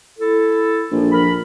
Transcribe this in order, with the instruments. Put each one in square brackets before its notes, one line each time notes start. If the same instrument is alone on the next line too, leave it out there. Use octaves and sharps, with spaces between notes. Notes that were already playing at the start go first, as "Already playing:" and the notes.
[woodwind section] E4 A4
[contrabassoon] A#1 [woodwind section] F3
[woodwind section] A#4 B5